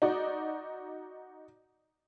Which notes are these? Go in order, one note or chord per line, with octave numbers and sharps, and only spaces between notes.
D#4 F#4 D5